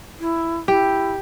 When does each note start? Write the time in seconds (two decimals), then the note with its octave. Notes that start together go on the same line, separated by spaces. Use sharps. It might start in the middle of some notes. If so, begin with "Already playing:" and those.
0.20 E4
0.68 E4 G4